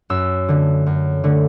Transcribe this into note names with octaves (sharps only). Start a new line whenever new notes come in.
F#2 E6
D3 A3
F#2
D3 A3